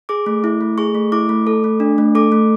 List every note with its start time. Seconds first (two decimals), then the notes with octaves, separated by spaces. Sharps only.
0.09 G#4 D6
0.26 A3
0.44 E4
0.61 A3
0.78 G#4 C#6
0.95 A3
1.12 E4 D6
1.29 A3
1.47 A4
1.64 A3
1.80 D4
1.98 A3
2.15 A4 D6
2.32 A3